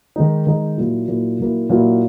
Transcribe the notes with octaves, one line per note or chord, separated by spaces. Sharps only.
D#3 G#3 D#4
D#3 G#3 D#4
A#2 F#3 A#3 E4
A#2 F#3 A#3 E4
A#2 F#3 A#3 E4
A#2 F#3 A#3 E4